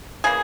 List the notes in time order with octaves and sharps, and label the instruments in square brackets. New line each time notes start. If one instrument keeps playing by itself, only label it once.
[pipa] C#3 E3 A#3 G#4